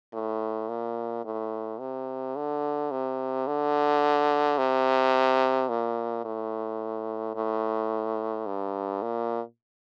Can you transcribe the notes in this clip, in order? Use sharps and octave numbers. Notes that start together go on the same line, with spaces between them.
A2
A#2
A2
C3
D3
C3
D3
C3
A#2
A2
A2
G2
A#2